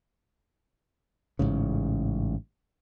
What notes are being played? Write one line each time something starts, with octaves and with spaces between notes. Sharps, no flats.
A1 G#2 C#3